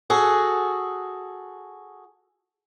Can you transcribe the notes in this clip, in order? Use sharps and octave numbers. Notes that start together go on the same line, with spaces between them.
F#4 G#4 A4